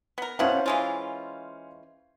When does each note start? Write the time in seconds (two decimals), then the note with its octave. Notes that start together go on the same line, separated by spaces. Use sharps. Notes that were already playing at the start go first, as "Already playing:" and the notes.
0.18 B3 A#4
0.39 B2 C#4 E4 C5 F5 F#5
0.66 E3 G#3 F4